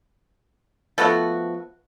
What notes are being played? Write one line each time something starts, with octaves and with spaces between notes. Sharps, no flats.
F3 A3 B3 F#4